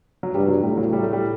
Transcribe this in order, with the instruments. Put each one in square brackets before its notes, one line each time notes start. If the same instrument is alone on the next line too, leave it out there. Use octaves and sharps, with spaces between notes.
[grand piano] F#3
[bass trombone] G2 [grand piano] G3
[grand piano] F#3
[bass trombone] A2 [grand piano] G3
[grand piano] F#3
G3
A3
G3